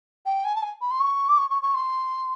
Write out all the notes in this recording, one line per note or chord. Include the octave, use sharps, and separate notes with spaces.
G5
G#5
A5
G#5
B5
C6
C#6
D6
C#6
C#6
C#6
C6